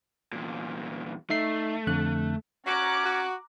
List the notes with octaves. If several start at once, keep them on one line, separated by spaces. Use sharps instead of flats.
E2 A#2
A3 D#4 E5 C7
F2 D3 F#6
C#4 F#4 A#5 D6 F#6
F#4